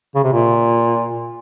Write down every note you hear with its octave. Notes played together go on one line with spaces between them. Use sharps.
C#3
C3
A#2